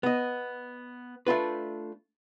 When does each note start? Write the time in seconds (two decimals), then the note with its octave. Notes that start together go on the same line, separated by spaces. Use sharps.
0.03 B3 D#5
1.27 A3 D4 F4 B4